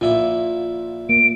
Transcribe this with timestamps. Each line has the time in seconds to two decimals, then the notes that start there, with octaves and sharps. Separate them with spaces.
0.01 A#2 E4 F4 D6
1.09 A#3 D7